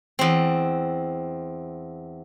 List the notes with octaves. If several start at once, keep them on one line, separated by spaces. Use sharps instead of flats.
E2 C4